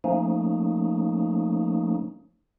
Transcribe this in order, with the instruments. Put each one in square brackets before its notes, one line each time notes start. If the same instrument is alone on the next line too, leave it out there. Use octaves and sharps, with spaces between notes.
[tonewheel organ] F3 A3 A#3 C#4 D#4